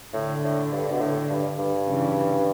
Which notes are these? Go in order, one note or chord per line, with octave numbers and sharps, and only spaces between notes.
A2 D3
A2
G2
B2
A2
G2
G2
C#3 E3